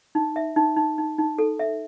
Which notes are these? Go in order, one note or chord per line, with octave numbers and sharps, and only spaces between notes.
D#4
E5
D#4
D#4
D#4
D#4
A4
E5